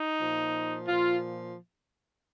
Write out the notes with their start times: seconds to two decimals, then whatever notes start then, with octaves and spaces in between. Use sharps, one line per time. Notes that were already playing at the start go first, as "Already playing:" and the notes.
Already playing: D#4
0.19 A#2 F3
0.87 A#2 F3 F4